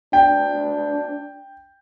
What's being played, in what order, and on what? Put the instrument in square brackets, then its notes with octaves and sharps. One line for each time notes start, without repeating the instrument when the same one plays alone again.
[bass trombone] D4 [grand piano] G5